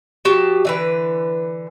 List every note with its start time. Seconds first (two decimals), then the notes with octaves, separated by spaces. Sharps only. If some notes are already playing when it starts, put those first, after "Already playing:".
0.25 F3 F#4 G4 A5
0.65 D3 E3 B4